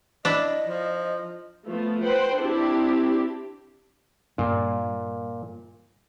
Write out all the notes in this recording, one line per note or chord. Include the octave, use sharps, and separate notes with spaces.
D4 E4 D#5
F3
F3 A3 B3 F4
B4 C5 F#5 G5
C4 D4 E4 G4
G2 A#2